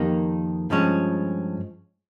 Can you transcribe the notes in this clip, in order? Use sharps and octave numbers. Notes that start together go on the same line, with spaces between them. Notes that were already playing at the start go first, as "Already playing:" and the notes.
Already playing: F2 D#3 A#3 D#4 G4
G2 F3 G#3 C#4